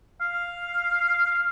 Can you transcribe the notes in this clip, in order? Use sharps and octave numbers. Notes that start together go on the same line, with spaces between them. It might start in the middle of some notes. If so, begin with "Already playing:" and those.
F5